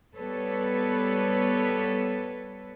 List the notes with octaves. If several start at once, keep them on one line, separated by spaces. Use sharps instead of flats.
G3 B3 A4 B4 C#5